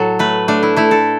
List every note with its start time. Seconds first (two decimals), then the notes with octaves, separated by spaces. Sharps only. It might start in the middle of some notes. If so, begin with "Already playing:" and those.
Already playing: A2 F#3 A4
0.19 A3 B4
0.48 A3 D4
0.63 E4
0.76 A3 E4
0.91 A4